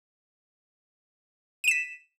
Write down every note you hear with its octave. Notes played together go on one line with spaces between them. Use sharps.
B6 D#7 E7